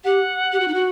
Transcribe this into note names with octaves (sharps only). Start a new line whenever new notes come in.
G4 F#5
G4
F#4
D#4
F#4